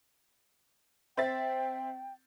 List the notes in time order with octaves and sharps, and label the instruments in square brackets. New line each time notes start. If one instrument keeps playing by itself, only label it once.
[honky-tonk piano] C4 E5 A6 [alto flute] G5